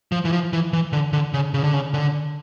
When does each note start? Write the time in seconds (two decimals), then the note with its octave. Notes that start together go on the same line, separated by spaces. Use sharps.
0.12 F3
0.25 E3
0.32 F3
0.53 E3
0.73 E3
0.93 D3
1.13 D3
1.34 C#3
1.54 C#3
1.64 D3
1.74 C#3
1.94 D3